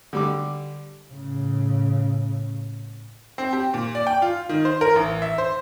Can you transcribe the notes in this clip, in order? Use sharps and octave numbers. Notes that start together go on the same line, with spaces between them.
D3 G3 D6
A2 C#3
C4
G4
A#2
D5
G5
F4
D#3
C5
A#4
A1
E5
C5